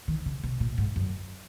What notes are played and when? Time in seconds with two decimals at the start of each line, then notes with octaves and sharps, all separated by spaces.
0.08 D#3
0.26 C#3
0.44 C3
0.60 A#2
0.78 G#2
0.96 F#2